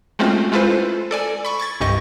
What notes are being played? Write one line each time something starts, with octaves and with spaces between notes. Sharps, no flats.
G#3 A3 C4 C#4 F4 F#4
G#3 E4 F4 A4 B4 C5
A4 D5 G#5
B5 C#6
C#6 G#6 A6
C2 G2 G4 D#5 C#6 A#6